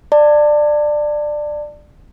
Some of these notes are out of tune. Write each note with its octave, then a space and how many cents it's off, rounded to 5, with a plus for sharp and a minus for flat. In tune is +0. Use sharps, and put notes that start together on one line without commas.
D5 +15 A5 +30